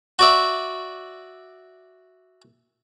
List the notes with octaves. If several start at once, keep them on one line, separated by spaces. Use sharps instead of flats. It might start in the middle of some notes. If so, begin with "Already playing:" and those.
F#4 D5 E5